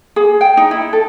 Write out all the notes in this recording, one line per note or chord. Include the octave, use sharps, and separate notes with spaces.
G#4
G5
D#4
E4
A4